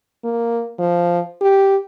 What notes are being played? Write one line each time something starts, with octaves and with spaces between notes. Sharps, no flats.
A#3
F3
G4